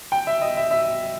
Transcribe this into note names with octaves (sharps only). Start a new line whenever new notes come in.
G5
E5
D#5
E5
E5